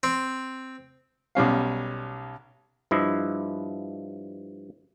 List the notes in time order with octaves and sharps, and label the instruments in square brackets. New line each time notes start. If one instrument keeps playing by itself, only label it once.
[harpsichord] C4
[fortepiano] B1 G3 C#4 F5
[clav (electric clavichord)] G2 F3 E4 D#5